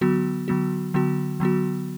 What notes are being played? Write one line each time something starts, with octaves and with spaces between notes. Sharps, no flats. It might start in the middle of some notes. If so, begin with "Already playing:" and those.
D3 F#3 B3 F#4
D3 F#3 B3 F#4
D3 F#3 B3 F#4
D3 F#3 B3 F#4